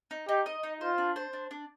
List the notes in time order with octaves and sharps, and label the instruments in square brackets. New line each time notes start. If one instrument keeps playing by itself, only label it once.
[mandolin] D#4
[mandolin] D#4 [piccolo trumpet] G4
[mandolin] D#5
D#4
[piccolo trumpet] F4 [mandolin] C5
[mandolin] D4
C5
D4
D4